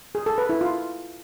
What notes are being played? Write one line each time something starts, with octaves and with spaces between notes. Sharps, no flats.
G#4
A4
B4
E4
F4